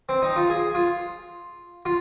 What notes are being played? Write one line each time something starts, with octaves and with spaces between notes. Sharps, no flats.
C4
D#4
F4
G#4
F4
F4